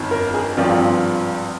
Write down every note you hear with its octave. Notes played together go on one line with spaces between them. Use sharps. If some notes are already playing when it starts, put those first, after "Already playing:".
Already playing: G1 F2 D#3
A#4
G#4
G#1 G2 F3 C4 F4